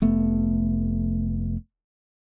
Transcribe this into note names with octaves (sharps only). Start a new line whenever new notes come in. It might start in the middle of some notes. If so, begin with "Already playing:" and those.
F1 A3 B3